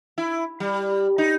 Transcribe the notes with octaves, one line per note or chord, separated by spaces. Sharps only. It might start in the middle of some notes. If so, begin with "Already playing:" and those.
E4
G3
D#4